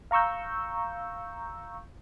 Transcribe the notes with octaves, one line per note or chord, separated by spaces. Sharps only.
F5 A#5 C#6 E6 G6